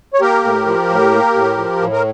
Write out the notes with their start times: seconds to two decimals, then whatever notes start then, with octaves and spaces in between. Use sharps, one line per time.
0.13 C#5
0.20 A#3 G4 A#4
0.44 A2
0.66 F3
0.90 A2
1.11 A#3
1.35 A2
1.57 F3
1.80 A2
1.93 A#4